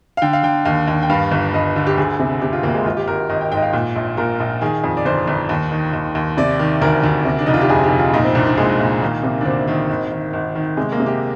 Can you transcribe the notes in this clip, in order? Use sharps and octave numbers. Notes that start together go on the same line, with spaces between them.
F5
D3 G5
F5
D3 G5
D#2 F5
D#2
G5
G2 F5
G1
G2 D#5
D3
G4
D2 G#4
C3
C3 G4
F4
D2 A#3
G#3
G#1 F4
G4
G#1 A#4
G#1 D#5
G5
G#2 G5
D#5
F5
A#2
A#1
A#2 A#4
A#1
D#3 G#4
F2
D5
G1 C5
G1
D#2
D#3
D#2
D#2
C3 D5
D#3
D2 A#4
D2
C3
D4
F1 D#4
F4
G4
F2 G#4
G4
F1
F4
A#2 D#4
C4
C2 D4
D4
A#2 G#3
A#2
D#3 A#3
C3
D4
D2 C4
D#3
G#1
D#3
G#1
D#3
C3 G#3
A#3
C3
G4